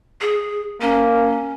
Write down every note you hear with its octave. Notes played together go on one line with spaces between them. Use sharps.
G#4
A#3 C#4